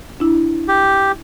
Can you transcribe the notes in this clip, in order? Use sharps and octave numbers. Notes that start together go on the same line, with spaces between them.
D4 E4
G4